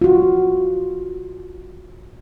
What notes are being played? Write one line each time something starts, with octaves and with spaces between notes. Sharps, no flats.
F4 F#4